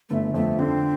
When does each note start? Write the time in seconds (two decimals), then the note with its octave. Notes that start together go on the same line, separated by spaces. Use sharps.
0.09 G1 A3
0.34 F2 A3
0.59 D3 C4